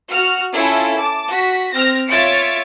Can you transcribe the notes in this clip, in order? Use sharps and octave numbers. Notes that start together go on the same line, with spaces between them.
F#4 F6
C#4 E4 F4 A4
A5 D6
F#4 B6
C4 F6 A#6
F4 C#5 E5 A6 D7